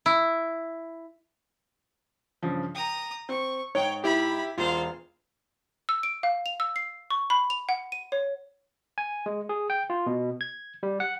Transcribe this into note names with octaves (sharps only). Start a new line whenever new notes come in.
E4
G2 C#3 F3
G5 A#5 D#6
C4 C#6
G#2 C#5 G5
E4 G4 B5
E1 F4 C5 F5
E6
D7
F5
F7
E6
C7
C#6
B5
F7
F#5
D#7
C#5
G#5
G#3
G#4
G5
F4
B2
G#6
G3
F#5